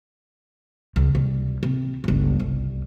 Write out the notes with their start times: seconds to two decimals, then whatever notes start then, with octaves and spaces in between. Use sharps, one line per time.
0.96 C#2
1.15 C2
1.63 C3
2.04 G1 C#2
2.40 C2